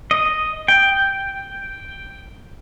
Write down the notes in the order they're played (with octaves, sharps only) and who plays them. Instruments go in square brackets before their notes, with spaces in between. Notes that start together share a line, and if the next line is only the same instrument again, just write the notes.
[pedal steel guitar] D#5
G5